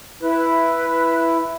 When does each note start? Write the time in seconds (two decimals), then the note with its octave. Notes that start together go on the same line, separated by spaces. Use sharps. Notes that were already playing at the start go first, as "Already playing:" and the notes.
0.22 E4 B4